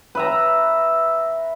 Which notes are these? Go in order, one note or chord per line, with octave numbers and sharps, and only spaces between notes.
B4 E5 A#5